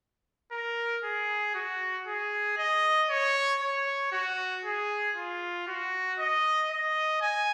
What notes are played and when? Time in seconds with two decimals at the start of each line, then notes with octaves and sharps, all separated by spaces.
0.52 A#4
1.04 G#4
1.54 F#4
2.07 G#4
2.57 D#5
3.09 C#5
3.62 C#5
4.12 F#4
4.65 G#4
5.16 F4
5.67 F#4
6.19 D#5
6.70 D#5
7.21 G#5